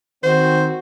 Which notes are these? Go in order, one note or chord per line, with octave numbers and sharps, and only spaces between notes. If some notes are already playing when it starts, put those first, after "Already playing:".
D#3 C4 F#4 C5